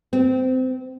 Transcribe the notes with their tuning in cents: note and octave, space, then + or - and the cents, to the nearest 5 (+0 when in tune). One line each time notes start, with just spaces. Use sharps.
C4 -25